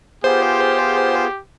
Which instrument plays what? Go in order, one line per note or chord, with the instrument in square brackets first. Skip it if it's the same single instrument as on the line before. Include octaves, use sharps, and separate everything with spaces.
[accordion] B3 F4 G#4 [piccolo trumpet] G4 [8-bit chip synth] C5